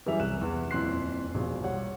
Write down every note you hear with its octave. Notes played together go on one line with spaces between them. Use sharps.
F#2 E3 G3 G#4 E5 F7
C2 F#6 E7
E2
D#1 F2 E4 C6 F#6 C7
E1 A#1
G3 C#5 F#5